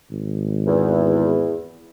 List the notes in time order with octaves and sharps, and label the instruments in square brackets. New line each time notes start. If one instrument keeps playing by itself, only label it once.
[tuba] G#1
[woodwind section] E2